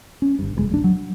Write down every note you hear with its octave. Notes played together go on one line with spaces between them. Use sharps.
C#4
G1 G2
F1 A#2 G#3
E1 A#1 D4
F#3